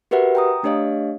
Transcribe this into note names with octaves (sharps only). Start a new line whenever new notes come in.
F#4 G4 A#4 B4 E5 F#5
G5 A#5 D#6
A3 D4 G4 C#5 D#5 F5